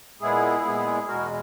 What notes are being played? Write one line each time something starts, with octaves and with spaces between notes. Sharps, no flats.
A#2 G#3 B3 E4 G#4
A#2 G#3 B3
E2 B2 G#3 F#4 A#4